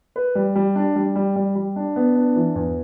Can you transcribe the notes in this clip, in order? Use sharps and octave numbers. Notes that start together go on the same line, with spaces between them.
B4
G3
G3
D4
G3
G3
G3
G3
D4
B3
D4
E3
E2